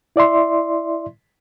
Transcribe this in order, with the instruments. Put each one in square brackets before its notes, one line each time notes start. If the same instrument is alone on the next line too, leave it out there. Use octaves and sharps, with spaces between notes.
[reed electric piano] E4 D5 E5 C6